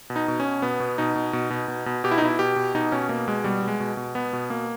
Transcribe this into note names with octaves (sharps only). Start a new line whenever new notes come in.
B2
D#4
B2
C#4
B2
B2 B3
B2
B2 D#4
B2
B2
B2
B2
B2
B2 G4
E4
D#4
B2 E4
B2 G4
B2
B2 D#4
B2 C#4
B2 A#3
B2 G#3
B2 G3
B2
G#3
B2
B2
B2 B3
B2
B2 A#3